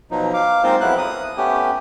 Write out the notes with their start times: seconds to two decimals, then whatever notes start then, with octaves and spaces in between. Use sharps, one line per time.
0.11 B2 F3 F#3 D#4
0.34 F5 D6
0.63 G#3 A#3 C4 D#4 F4 C5
0.81 F2 F3 F#3 B3 E4 F#6
0.98 D#6
1.37 A3 B3 C#4 G4